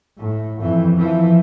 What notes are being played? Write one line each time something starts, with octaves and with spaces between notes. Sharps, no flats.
A2
F2 E3
E3 F3